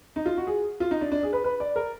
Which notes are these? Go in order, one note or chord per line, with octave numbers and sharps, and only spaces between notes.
D#4
F4
F#4
G#4
F4
D#4
D4
D4
G#4
B4
B4
D5
A#4